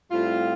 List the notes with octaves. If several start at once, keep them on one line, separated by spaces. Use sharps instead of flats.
A2 G3 C4 F4